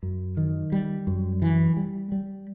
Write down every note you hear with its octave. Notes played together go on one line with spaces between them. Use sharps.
F#2
D#3
G3
F#2
E3
G3
G3